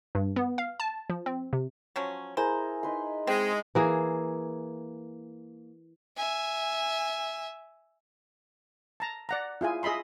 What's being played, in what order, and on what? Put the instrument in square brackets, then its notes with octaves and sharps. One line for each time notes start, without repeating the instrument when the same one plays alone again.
[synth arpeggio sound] G2
B3
F5
A5
F3
C4
C3
[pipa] F3 F#3 C#4
[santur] E4 G#4 A#4 [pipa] C5
[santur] D#4 B4 C6
[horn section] G#3 [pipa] C4
[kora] E3 A#3 G#4
[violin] E5 G#5
[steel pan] A5 A#5
D5 F#5 A#5
E4 F4 G#4 G#5
G#4 D#5 E5 B5 C6